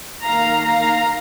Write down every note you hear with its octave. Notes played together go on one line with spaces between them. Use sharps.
D#3 A#3 F5 A#5
F5 A#5